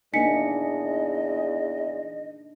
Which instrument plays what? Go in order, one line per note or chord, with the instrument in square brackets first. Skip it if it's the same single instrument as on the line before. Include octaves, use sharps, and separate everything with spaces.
[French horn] E2 [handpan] A#3 D4 D#4 [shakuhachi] D#5 [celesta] G#5 B6 C#7